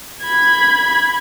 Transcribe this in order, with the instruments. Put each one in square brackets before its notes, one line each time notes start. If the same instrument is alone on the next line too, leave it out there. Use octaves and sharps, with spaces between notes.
[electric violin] B5 G#6